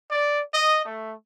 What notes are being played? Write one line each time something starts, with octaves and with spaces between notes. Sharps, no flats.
D5
D#5
A3